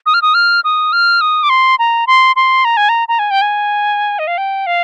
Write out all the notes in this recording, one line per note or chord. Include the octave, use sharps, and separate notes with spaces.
D#6
F6
D#6
F6
D#6
F6
D#6
D6
C6
A#5
C6
C6
A#5
G#5
A#5
A#5
G#5
G5
G#5
D#5
F5
G5
F5